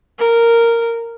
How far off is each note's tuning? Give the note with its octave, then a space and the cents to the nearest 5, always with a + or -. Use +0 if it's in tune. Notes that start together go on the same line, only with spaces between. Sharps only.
A#4 -10